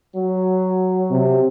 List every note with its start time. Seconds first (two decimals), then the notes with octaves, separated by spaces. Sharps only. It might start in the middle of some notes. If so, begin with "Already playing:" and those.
0.16 F#3
1.11 C3